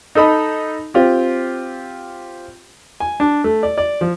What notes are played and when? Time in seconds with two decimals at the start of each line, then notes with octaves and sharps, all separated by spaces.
0.15 D#4 A4 D#5 B5
0.94 C4 F4 G4
3.00 G#5
3.20 D4
3.44 A3
3.63 D5
3.78 D5
4.01 F3